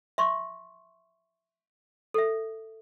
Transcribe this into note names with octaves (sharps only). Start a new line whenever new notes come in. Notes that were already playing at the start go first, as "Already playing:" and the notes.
E5 C6 C#6
A4 E5